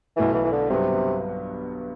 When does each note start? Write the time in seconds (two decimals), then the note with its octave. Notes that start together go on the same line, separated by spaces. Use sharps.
0.16 B1 B2 E3 A3 E4
0.34 E3
0.44 E3
0.52 D3
0.70 G1 G2 C3 F#3 B3